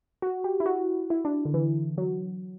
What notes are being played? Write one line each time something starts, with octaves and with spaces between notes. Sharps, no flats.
F#4
G4
E4
F#4
E4
D4
D3
E3
F#3